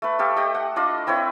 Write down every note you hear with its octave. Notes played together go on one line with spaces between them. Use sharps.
A3 B4
G4 A4 F5
G4 D#5 G5 D#6
F#5
D4 F4 D5 D#5
C4 E4 B4 C#5